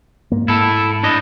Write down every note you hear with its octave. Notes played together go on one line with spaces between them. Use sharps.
G#2 A#3
G#2 E4 A4
D4 E4 D#5